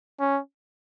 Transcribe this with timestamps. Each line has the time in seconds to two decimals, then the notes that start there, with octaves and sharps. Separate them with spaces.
0.20 C#4